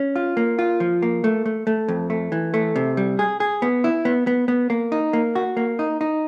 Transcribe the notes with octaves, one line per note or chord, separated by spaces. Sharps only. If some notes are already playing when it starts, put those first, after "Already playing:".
Already playing: C#4
F4
A#3
F4
F3
A#3
A3
A3
A3
F2
A3
E3
A3
C3
G3
G#4
G#4
B3
E4
B3
B3
B3
A#3
D#4
A#3
F#4
A#3
D#4
D#4